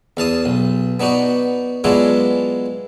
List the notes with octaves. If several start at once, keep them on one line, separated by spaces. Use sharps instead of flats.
E2 F5 A5 D#6
B1
B3 D4 D#4 F#4
F#3 G#3 B3 D4 E4 F4